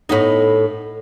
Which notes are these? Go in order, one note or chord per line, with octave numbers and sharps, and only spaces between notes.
A2 B3 D#4